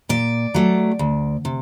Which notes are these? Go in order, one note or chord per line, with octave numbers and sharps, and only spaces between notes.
A#2 D5
F#3 A3
D2
C3